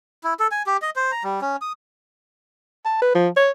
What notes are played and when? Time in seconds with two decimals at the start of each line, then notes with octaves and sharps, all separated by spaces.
0.24 E4
0.40 A4
0.51 G#5
0.66 G4
0.82 D#5
0.96 C5
1.12 A#5
1.24 G3
1.41 C#4
1.61 D#6
2.85 A5
3.02 B4
3.15 F3
3.37 C#5